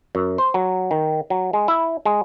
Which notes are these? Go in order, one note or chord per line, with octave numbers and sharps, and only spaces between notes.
F#2
C5
F#3
D#3
F#3
G#3
E4
G#3